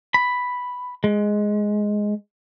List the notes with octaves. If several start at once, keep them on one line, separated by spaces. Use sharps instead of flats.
B5
G#3